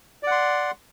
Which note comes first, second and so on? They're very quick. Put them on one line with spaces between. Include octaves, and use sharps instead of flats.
D5 F#5 C6